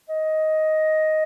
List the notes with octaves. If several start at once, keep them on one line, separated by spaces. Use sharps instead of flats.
D#5